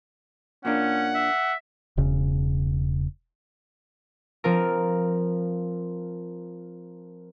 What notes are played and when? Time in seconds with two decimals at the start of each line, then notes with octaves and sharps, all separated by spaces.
0.65 A#2 A#3 C#4 D4 F#5
1.14 E5
1.97 E1 C#3
4.44 F3 C4 F4 A#4